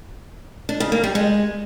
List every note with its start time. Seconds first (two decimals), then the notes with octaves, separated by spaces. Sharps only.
0.69 D4
0.80 C#3
0.92 A#3
1.04 G3
1.15 G#3